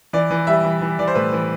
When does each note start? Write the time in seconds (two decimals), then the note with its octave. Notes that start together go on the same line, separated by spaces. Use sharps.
0.13 E3 D5
0.31 E3
0.47 G3 E5
0.65 E3
0.81 E3
0.99 E3 D5
1.08 C5
1.15 A2 B4
1.33 E3